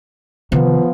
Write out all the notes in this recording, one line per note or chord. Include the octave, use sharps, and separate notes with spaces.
C3 D#3 F3 B3